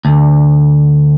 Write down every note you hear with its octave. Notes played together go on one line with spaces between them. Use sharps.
D2